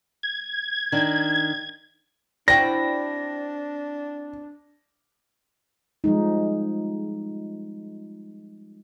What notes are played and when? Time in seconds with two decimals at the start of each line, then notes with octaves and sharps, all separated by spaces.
0.23 G#6
0.92 D#3 D4
2.48 C4 D4 E4 F#4 D5 G5 A#6
6.04 F3 G3 G#3 D#4